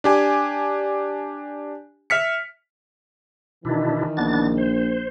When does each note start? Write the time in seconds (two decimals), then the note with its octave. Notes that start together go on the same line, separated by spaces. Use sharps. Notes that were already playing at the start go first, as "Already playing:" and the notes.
0.04 D4 G4 G#5
2.10 E5 F6 B6 C#7
3.65 B2 D#3 E3 D4 E4
4.17 A#1 B3 D4 A6
4.57 C5